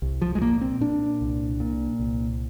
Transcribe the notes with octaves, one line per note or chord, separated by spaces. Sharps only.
C2
F3
G#3
A#2 A#3
C4
A#2 D4
C2
A#2
C2